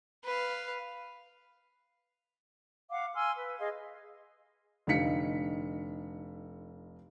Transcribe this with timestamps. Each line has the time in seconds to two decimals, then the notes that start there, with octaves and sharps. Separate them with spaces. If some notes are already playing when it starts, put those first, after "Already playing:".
0.25 B4 F5
2.89 F5 F#5 D6
3.14 G#5 C6 E6 F6
3.34 B4
3.58 G#4 D#5 F5 C6
4.87 F1 D3 D#4 F5 B6 C#7